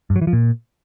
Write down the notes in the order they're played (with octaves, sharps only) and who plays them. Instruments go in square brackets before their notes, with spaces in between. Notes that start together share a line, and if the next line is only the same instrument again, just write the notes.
[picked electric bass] G2
F#3
E3
F3
A#2